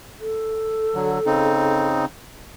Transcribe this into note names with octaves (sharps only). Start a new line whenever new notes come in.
A4
D3 F#3
C#3 C4 D#4